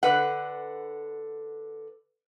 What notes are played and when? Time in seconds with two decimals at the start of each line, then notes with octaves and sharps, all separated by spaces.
0.03 D3 B4 F#5